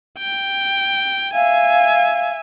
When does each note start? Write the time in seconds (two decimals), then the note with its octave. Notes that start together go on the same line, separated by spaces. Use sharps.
0.18 G5
1.33 E5 F5 G#5